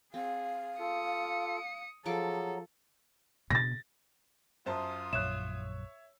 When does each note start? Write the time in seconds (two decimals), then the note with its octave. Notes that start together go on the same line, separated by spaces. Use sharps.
0.14 C4 G#4 F5
0.79 F4 A4 D#6 C#7
2.06 F3 F#3 G#4 A4 A#5 C#6 D6
3.50 B2 A6 A#6
4.66 F#2 F4 C5 A5 D#6
5.13 A#1 F#2 C#5 E5 F#6 E7